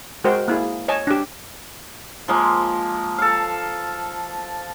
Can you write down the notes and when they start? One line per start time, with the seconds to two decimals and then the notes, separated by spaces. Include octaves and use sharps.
0.24 G#3 F#4 A#4 C5 D#5 G5
0.48 A#3 E4 G#4
0.88 C#5 D#5 G#5 A5
1.07 D4 G4
2.28 F3 G#3 A#3
3.18 A4 F5